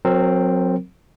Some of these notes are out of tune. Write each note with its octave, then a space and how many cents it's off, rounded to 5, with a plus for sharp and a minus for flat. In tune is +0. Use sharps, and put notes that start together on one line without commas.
F#3 -25 C4 +0 A#4 -25